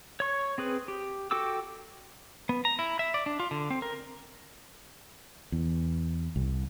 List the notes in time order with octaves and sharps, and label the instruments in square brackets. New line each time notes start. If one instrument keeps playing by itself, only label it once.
[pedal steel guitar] C#5 C#6
C4 G#4 B4
G4
F#4 A4 G5 D6 E6
B3
A#5
E4
E5
D5
D4
F4
D3
C4
A#4
[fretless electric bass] E2
C2